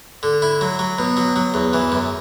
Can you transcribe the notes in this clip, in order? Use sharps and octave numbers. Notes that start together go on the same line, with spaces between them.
D3
E4
F#3
F#3
B2
F#3
F#3
E2
E3
F#2